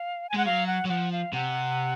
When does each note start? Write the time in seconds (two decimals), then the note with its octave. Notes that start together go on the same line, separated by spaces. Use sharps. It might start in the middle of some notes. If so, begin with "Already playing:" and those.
Already playing: F5
0.30 G#5
0.34 G#3 F#5
0.46 F#3 F5
0.67 F#5
0.85 F#3
0.89 F3 F#5
1.12 F5
1.33 C3 F#5